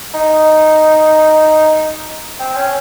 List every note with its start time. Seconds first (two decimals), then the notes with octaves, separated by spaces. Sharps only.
0.14 D#4
2.40 C4
2.56 C#4